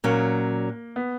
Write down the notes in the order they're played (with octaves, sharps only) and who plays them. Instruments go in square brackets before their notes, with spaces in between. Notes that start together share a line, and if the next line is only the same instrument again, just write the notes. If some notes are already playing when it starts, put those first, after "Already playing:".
[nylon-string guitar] A#2 F#3 C#4 [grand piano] A#3
[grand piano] B3